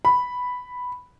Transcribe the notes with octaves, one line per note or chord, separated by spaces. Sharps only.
B5